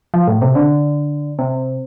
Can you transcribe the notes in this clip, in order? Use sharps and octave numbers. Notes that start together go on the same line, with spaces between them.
F3
A2
C3
D3
C3